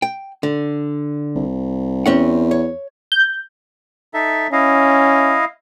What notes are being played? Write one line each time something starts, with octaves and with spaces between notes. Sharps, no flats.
G5
D3
C2
E2 C4 C#4 F#5
C#5
G6
D#4 A4 E5
C#4 E4 D#5 F5